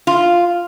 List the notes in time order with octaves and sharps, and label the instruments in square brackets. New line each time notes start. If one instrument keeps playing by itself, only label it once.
[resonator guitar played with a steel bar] F4